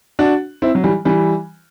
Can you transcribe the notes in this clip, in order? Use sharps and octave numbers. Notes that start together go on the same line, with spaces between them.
D4 F#4
C4 E4
F#3
E3 G3
E3 G3